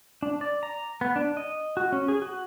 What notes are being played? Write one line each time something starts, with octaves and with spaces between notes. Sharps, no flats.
D4
D5
A#5
B3
D4
D#5
F#4
C#4
G#4
F#4